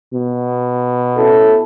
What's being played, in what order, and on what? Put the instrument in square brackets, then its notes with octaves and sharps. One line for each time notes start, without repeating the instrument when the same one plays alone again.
[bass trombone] B2
[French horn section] C#4 E4 A4